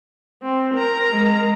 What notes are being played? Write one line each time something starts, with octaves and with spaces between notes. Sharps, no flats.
C4
A#4 A#5
G#3